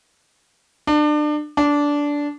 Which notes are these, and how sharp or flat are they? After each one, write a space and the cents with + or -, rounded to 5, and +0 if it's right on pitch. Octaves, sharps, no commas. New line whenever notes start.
D4 +30
D4 -15